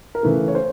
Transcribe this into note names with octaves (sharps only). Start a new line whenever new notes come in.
A#4
C#3 E3 A3 B4
C#5
C5